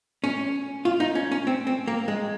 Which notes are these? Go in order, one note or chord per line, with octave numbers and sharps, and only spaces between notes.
C#4
F4
D#4
C#4
C#4
C4
C4
A#3
G#3